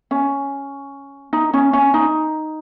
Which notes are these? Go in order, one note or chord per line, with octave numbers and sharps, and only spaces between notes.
C#4
D#4
C#4
C#4
D#4